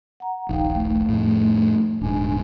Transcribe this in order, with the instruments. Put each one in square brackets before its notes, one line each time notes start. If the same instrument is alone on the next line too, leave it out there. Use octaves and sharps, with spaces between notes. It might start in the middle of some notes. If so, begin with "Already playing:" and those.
[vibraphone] F#5 A#5
[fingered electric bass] D#1 A#1 [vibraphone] D#4 F5 G5
[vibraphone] A3
[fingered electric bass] F2 A2
[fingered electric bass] D#1 G#2 [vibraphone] D4 G#5